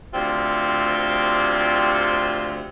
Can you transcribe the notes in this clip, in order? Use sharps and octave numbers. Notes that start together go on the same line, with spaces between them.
D2 C3 C4 F4 D5